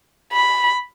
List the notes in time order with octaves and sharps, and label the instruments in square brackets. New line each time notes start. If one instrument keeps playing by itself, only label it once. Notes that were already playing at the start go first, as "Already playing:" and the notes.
[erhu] B5